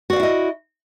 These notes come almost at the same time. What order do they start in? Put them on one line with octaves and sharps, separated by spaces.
F#4 D5 F5 E4 D#5